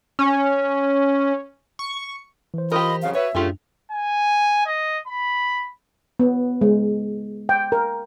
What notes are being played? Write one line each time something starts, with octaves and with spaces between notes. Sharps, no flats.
C#4
C#6
E3 C5
F4 G4 A#4 D#5 B5
F2 C#3 F#3 F5
F#4 B4 C#5 E5
F#2 A2 A3 D4 F4 G4 G#4
G#5
D#5
B5
B3
G#3
G5
A#4